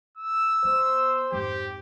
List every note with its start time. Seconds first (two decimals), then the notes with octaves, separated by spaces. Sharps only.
0.17 E6
0.64 B3 C5
1.32 F2 G#2 G4